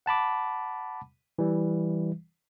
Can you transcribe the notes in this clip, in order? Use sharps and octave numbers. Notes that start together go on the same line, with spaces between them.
F#5 A5 B5 D6
E3 G3